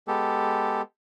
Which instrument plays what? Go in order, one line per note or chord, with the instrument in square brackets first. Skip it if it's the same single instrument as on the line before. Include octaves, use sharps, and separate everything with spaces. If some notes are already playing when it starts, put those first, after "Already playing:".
[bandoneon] G#3 B3 G4 A4